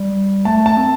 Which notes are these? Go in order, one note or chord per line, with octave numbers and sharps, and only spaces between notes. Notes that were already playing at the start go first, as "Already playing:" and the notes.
Already playing: G3
A3 A5
A5
C4